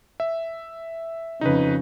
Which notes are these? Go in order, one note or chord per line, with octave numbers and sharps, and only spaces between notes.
E5
F2 C#3 D#4 B4